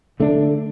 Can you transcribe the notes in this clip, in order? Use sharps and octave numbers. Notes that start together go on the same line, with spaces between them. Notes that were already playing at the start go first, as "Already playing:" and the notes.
D3 A3 D4